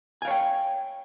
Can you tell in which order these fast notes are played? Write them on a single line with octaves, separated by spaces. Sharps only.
G#5 F5 C#5 G5